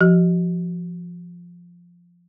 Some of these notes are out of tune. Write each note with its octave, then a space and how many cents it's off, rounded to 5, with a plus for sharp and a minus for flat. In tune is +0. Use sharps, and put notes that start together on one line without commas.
F3 +0 F#4 +45